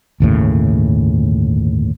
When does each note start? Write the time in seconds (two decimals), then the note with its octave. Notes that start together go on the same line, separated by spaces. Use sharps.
0.20 G1 D#2 A2 C#3